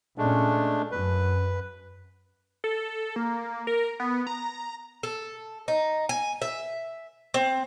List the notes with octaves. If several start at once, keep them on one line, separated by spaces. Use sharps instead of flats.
A#2 G#3 A3 C#4 D4
F#2 B4
A4
A#3
A#4
B3
A#5
A4
D#4
G#5
E5
C4